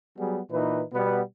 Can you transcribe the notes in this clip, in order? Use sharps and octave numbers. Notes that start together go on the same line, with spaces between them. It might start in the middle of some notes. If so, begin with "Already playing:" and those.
F#3 G3 B3 G#4
A#2 E3 D#4 B4
B2 G3 B3